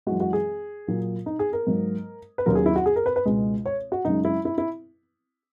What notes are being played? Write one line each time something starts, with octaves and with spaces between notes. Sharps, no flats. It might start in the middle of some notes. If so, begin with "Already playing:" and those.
F#2 E3 G#3 F#4
F#4
G#4
A#2 F#3 A#3
D#4
G#4
A#4
G#2 F#3 A#3
B4
D#2 C#3 F#3 A#4
G#4
E4
F#4
G#4
A#4
B4
B4
C#2 B2 G#3
C#5
F#4
F#2 C#3 G#3 D#4
E4
E4
E4